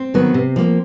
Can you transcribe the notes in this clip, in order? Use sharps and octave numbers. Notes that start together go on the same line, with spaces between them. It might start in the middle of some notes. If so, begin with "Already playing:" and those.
Already playing: C4
D#3 F#3 B3
C3
F3 A#3